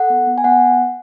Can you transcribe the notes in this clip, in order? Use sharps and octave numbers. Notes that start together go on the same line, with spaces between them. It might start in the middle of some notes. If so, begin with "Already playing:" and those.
Already playing: A4 F#5
B3
B3
G#5
B3 F#5